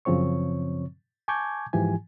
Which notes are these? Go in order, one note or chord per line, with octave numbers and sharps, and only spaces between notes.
F#2 C#3 F3 C4 C#5 C#6
G#5 A5 C#6 D6 G6 G#6
G#2 E3 F3 G4 G#5